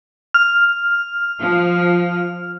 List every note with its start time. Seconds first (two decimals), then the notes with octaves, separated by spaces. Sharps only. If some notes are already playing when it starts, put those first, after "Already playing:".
0.34 F6
1.40 F3